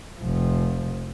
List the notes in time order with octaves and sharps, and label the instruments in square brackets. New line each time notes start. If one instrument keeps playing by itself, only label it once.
[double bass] F1 F3